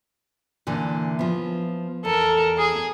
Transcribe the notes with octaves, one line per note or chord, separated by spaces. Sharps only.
A#2 D3 E3
F3 B3
E2 A4 A#4
G#4